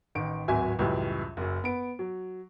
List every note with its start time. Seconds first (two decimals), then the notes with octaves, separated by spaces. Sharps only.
0.15 A1 D#3 D7
0.48 D1 G#1 F#3 E5 G#5
0.79 C#2 F#2 A2 E3 G3
1.37 F#1 F#2
1.64 B3 D7
1.99 F#3